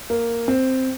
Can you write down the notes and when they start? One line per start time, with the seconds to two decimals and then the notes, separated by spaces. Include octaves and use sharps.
0.10 A#3
0.48 C4